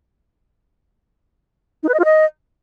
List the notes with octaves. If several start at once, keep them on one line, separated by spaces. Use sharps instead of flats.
D#4
B4
D#5
F4
D#5